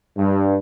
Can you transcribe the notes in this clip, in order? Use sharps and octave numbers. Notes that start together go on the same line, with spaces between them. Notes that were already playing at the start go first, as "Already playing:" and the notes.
G2